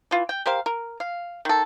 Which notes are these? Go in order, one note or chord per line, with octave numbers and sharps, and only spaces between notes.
E3 F4
G5
G4 A#4 C5 F5
A#4
F5
D#3 A4